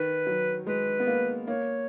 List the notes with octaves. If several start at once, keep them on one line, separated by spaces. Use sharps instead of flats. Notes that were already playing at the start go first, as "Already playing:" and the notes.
Already playing: D#3 B4
F#3
G#3 B4
B3
A#3
A#3 C#5